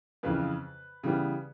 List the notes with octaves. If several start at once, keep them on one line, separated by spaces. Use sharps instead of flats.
F2 C#3 E3 B4
C#3 E3 G3 B3